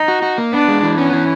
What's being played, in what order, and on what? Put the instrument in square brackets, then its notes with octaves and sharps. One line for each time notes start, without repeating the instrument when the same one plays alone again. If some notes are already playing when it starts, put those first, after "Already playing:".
Already playing: [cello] D#4
[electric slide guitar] F#4
F#4
A#3
[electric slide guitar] B3 [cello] D4
[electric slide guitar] G#3
E3
[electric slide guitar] B3 [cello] C#4
[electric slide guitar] E3